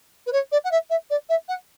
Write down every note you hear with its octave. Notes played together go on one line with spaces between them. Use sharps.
B4
C#5
D5
F#5
E5
E5
D5
E5
F#5